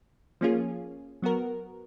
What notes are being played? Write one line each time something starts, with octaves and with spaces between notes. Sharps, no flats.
F3 A#3 C#4 F4 G#4
F#3 B3 F#4 A#4